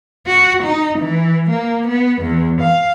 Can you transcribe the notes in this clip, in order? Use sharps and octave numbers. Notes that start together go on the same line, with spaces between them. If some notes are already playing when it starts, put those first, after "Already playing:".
F#4
D#4
E3
A#3
B3
E2
F5